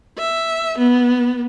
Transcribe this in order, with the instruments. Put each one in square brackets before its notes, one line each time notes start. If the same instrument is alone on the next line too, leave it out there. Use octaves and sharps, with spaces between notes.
[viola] E5
B3